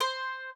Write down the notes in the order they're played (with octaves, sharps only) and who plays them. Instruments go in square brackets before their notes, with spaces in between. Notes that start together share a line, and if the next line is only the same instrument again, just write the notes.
[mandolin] C5